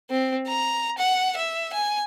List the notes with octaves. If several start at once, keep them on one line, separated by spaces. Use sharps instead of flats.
C4
A#5
F#5
E5
G#5